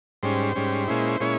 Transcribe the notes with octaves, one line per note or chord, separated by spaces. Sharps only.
G#2 G3 C#4 C5
G#2 G3 C#4
A#2 G#3 C#4 E4
A#2 G#3 C#4 E4 C#5